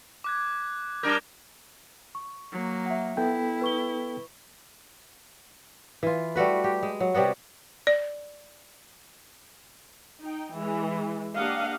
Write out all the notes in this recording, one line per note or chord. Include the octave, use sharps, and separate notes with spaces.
D6 F#6 G#6
G3 D4 A#4 D#6 G6 G#6
C#6
F#3 A#3
E5 F#5
B3 E4 A4 G5
B4 C#6 G7
E3 F4
G3 A3 F#4 B4
G4
G#3
F#3
C3 G3 B3 F#4
D5
D#4 G5
E3 G#3
A#3 D4 G4 D#5 F5 F#5